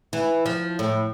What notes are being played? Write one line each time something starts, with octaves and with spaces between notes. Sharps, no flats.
E3
F3
A2